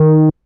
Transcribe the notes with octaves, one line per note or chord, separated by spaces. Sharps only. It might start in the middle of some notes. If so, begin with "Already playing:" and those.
Already playing: D#3